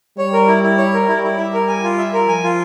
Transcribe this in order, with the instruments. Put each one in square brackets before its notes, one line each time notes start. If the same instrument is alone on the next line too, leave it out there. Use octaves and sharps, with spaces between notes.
[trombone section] G3 [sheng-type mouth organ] C#5
[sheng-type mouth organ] A#4
E4
E4
C#5
A#4
[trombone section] G3 [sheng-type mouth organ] E4
[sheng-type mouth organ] E4
[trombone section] G3 [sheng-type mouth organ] E5
[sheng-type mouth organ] A#4
G#5
F4
E5
A#4
[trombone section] F3 [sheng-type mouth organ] G#5
[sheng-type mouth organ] F4